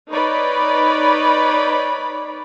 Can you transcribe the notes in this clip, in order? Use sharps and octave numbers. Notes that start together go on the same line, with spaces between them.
D#4 B4 C#5 D5 B5